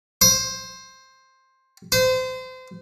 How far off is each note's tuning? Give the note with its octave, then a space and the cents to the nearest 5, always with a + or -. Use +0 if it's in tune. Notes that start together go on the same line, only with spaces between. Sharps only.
C5 +10
C5 -30